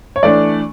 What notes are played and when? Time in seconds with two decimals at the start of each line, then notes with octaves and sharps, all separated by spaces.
0.16 C#5
0.23 E3 A3 D4 D5